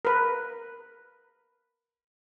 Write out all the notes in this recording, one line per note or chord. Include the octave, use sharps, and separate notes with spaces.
A#4 B4